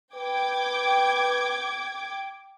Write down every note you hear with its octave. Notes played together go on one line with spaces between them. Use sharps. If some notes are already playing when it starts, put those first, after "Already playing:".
B4 G5 D6 G#6